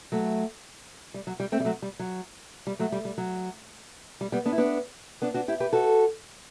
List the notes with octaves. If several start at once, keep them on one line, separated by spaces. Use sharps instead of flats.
F#3 A3
G3
F#3
G3
A3 C4
G3
F#3 A3
G3
F#3
G3
F#3 A3
G3
G3
F#3
G3
G3 B3
B3 D4
E4
B3 D4
B3 D4
D4 F#4
E4 G4
G4 B4
F#4 A4